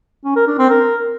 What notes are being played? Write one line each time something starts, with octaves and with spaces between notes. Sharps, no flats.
C#4
A#4
D4
C4
A#4